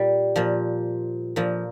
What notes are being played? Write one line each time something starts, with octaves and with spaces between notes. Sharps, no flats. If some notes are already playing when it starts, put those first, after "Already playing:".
Already playing: A#2 G3
A#2 F3
A#2 F3